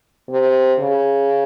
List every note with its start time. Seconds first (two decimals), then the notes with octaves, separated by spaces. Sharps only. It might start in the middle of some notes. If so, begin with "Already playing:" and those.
0.29 C3
0.79 C#3